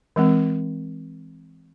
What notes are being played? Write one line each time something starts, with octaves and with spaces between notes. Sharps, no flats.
E3 G#3 C4